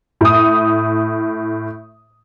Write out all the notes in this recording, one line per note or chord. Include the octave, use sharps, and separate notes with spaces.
A2 D#6